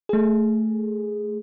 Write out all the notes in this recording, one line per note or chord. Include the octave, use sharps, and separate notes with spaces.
A3 G#4